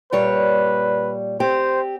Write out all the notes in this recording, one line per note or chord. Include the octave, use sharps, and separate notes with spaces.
A#2 G3 B4 C#5
C4 G4 C5